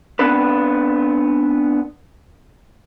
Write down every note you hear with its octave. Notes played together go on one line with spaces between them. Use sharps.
B3 C4 D4 B4